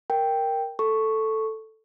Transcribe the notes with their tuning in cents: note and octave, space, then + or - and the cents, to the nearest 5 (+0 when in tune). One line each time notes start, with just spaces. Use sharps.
A#4 +0 G5 +0
A4 +0 C#6 +0